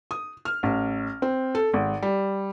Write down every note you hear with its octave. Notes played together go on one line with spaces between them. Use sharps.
D#6
F6
A1
C4
A4
G#1
G3